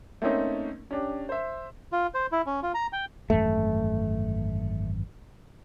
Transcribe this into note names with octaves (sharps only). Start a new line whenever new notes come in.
A3 A#3 C4 C#4 D#4
C#4 D4 G4
C5 E5
F4
C5
E4
C#4
F4
A#5
G5
G#1 F#2 E3 A3